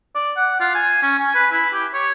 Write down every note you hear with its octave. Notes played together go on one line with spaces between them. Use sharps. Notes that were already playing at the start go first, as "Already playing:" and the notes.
D5
F#5
F4
G#5
C#4
G#5
B4
E4
G4
C#5